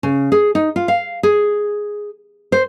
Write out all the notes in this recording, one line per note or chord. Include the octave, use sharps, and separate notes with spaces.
C#3
G#4
D#4
F4
F5
G#4
C5